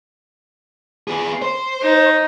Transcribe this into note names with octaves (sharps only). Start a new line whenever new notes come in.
B3 G#4
C5
D#4